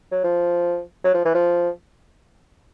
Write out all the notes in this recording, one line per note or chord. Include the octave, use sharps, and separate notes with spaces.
F#3
F3
F#3
F3
E3
F3